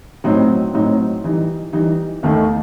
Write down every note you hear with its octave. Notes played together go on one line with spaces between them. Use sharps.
A2 F#3 C4 D#4
A2 F#3 C4 D#4
E3 G3 D#4
E3 G3 D#4
D#2 D#3 A3 D#4